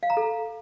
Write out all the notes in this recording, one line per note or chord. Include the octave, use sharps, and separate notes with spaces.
F5
A#5
A4